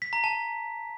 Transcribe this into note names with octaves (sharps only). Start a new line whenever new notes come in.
B6
A#5
A5